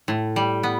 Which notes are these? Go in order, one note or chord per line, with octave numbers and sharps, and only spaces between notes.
A2
G3
B3